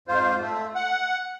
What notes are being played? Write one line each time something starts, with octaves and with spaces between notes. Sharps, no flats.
F2 G#2 F4 C5
A3
F#5